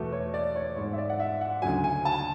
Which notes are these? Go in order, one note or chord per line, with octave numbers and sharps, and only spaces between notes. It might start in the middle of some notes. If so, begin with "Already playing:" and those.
Already playing: E2 B2 A3
C#5
D5
C#5
G#2 G#3 C#5
E5
D5
F#5
E5
F#5
D2 C#3 F#3 G#5
G#5
A5